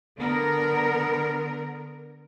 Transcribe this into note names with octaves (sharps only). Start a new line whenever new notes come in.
D3 B3 A#4